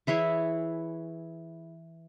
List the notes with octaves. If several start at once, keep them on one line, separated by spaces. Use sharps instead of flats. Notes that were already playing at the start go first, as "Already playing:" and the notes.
E3 E4 G#4 C#5